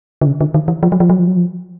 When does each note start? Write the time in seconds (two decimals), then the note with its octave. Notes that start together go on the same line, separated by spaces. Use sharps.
0.21 D3
0.27 C#3
0.41 D3
0.54 D#3
0.68 E3
0.83 F3
0.92 F#3
1.00 F3
1.10 F#3
1.19 F3
1.28 F#3
1.37 F3